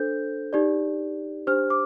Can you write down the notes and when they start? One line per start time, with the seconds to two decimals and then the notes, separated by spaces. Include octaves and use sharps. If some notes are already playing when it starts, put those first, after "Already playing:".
Already playing: D4 A4 C5 G6
0.53 D#4 G4 D5
1.47 D4 G4 C5 F6
1.70 D6